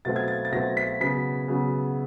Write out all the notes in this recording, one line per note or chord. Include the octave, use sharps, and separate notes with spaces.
B2 F#3 A3 C4 A6
G#6
A6
A6
B2 F#3 A3 C4 A#6
B6
C#3 F#3 B3 B6
C#3 F#3 B3